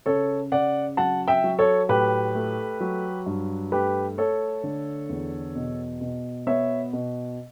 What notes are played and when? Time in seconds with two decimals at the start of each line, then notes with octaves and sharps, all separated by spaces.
0.06 C#3 A4 C#5
0.52 C#3 D5 F#5
0.97 F#3 F#5 A5
1.28 E5 G5
1.44 F#3
1.59 A4 C#5
1.89 A2 G4 B4
2.35 A3
2.80 F#3
3.26 G2
3.72 A3 G4 B4
4.18 A3 A4 C#5
4.64 D3
5.09 E2
5.56 B2
6.01 B2
6.47 B3 C#5 E5
6.93 B2